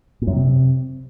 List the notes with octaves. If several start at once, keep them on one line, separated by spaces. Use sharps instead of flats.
A#2
F#2
C3